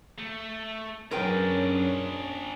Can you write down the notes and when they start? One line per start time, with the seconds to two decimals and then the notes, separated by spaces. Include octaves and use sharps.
0.18 A3
1.11 F#2 F#3 C#4 D4 G#4 A#4 B4 G5